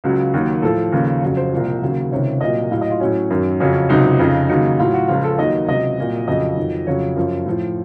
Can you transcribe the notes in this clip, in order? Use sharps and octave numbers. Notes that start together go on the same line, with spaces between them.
C#2 C#3 F#3
D#2 D#3 F#3
A2 F3 A4
D#2 C#3 F3
F2 C#3 F#3
C5
C2 A#2 F3
D#2 C#3 F#3
C#2 C3 D#3 C#5
C2 A#2 F#3 D#5
A2 F#3 F5
D#5
F4
A2 F#3 C#4
F#2 D#3 F#3
F2 C#3 F#3 C#4
C#2 C3 F#3 D#4
F2 C#3 F3
D#2 C#3 F#3 D#4
A2 F#3 F4
F#4
C#2 C#3 F3 F4
A4
D#2 D#3 F#3 D#5
C#2 C3 F#3 D#5
C2 A#2 F#3
F2 C#3 F#3 D#5
F2 D#3 F#3
F2 C#3 F#3 C#5
F#2 F3
A2 F3